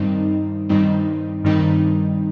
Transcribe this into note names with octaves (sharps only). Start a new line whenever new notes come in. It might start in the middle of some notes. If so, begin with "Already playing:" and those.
Already playing: G2 D#3 G3 C4 D#4
G2 D#3 G3 C4 D#4
G2 D#3 G3 C4 D#4